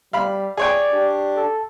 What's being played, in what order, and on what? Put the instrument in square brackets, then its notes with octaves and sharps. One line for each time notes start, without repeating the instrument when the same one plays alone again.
[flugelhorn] G3 [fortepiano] F5 B5
[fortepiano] G#4 C#5 G5 [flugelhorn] D5
[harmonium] D4 G4
[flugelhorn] A4